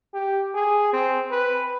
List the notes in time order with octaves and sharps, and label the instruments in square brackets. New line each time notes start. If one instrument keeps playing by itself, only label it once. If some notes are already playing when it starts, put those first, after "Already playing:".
[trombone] G4
G#4
C4
B4